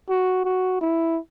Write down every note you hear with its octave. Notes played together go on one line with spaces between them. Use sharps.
F#4
F#4
E4